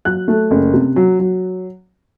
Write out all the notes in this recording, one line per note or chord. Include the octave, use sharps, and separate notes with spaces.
F#3 F#6
A3
F#1
C3
F#3
F#3